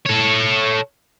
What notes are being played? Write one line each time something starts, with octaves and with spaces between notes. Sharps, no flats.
A4 C#5